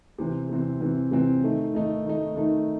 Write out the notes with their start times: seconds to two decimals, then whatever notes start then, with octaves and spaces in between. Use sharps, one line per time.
0.18 C3 E3 C4
0.49 C3 E3 C4
0.81 C3 E3 C4
1.11 C3 E3 C4
1.43 D#3 A3 D#4
1.74 D#3 A3 D#4
2.05 D#3 A3 D#4
2.35 D#3 A3 D#4